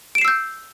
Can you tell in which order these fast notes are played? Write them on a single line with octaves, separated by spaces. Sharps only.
D7 E7 C7 E6 G6